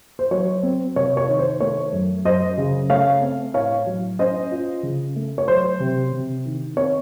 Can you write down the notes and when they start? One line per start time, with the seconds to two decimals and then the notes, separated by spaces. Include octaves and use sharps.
0.19 C5
0.31 F#3 C#5
0.63 C4
0.96 C3 C#5
1.17 C#5
1.28 D#3
1.39 C5
1.60 A3 C#5
1.92 F#2
2.25 F#2 C5 D#5
2.58 C#3
2.90 A3 C#5 F5
3.21 C4
3.54 A2 C#5 F5
3.86 F#3
4.19 C#4 C5 D#5
4.51 F4
4.83 C#3
5.16 A3
5.38 C#5
5.48 F#3 C5
5.80 C3
6.13 C3
6.46 D#3
6.77 C4 C#5